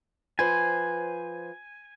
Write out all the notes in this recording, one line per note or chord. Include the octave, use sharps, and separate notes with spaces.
F3 B4 C5 G#5